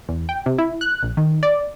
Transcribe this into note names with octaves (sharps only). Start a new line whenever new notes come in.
E2
G5
C3
E4
F#6
A#1
D#3
D5